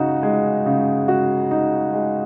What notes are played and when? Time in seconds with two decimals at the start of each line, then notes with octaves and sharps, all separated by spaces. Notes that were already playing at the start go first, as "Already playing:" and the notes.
Already playing: C#3 D#4 F#4
0.23 G#3
0.66 C#3
1.08 F#4
1.51 D#4
1.93 G#3